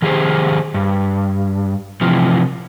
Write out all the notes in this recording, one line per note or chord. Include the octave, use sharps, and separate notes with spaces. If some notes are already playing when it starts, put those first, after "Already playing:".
D#3 G4 G#4 C5
G2
C3 E3 F3